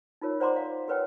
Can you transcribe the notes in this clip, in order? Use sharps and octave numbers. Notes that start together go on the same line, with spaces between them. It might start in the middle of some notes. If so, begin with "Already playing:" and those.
D#4 F4 A#4 C#5
C5 D5 F#5 A#5 C6 D6
F5
G4 A#4 B4 C#5 F#5 G5